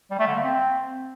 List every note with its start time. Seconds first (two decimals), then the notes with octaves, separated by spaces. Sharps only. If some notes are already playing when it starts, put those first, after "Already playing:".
0.11 G3
0.19 A3
0.27 D3
0.35 A#3
0.43 C4